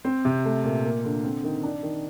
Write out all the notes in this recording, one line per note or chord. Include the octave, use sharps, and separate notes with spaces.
C4
C3
A3
A#2
A#3
D3
C4
D#3
D4
D#3